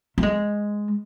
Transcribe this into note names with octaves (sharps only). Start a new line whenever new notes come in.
A3
G#3